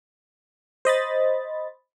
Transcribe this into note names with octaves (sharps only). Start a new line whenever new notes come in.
C5 D#5 B5 A6